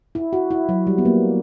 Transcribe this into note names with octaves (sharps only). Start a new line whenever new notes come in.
E4
F#4
E4
F#3
G3
B3
A#3